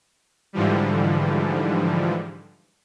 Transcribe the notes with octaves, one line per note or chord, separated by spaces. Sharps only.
G#2 D3 E3 F3 G3